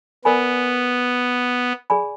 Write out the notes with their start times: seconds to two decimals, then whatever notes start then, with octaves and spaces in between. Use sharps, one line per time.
0.25 B3 A#4 D5 G#5 B5
1.90 G#4 D5 G#5 B5